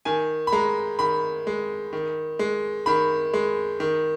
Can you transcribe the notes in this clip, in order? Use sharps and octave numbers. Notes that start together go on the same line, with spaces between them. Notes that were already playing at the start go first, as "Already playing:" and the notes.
D#3 G#5
B5
G#3 A#5
D#3 B5
G#3
D#3
G#3
D#3 B5
G#3
D#3